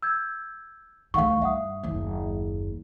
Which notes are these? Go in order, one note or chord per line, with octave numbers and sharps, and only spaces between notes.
E6 G6 G#6
D2 D#3 F5 F#5 C#6
G2 E5 F#5 D#6
F#1 D#2